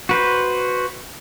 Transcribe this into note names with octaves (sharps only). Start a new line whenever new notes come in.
F#4 B4 C5